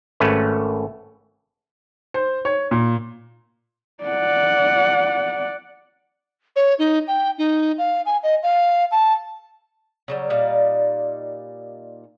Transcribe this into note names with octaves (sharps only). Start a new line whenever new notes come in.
G#1 A3 C#4 B4
C5
C#5
A#2
D5 F#5
C#5
D#4
G5
D#4
F5
G#5
D#5
F5
A5
C#3 F#3 G3
A#2 G3 D#4 F5